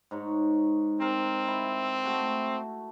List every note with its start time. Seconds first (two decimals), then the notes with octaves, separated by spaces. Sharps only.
0.11 G#2 D#4 C#5
1.01 C4 A#4
1.48 E4
2.04 A3 F#4